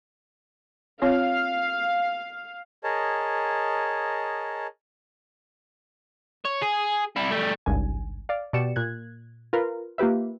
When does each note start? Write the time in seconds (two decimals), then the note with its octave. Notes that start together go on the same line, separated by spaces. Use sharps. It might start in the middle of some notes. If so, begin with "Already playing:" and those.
1.02 C4 F4 C#5 F5
2.84 G#4 A#4 C#5 D#5 A5
6.45 C#5
6.62 G#4
7.16 G3 E4
7.32 G3 A3
7.66 G#1 C#2 G2 G#5
8.29 D5 F5
8.53 B2 G4 D5 C#7 E7
8.76 A#2 F#6 G#6
9.53 F4 A#4 B4
9.98 A#3 F4 G4 B4 E5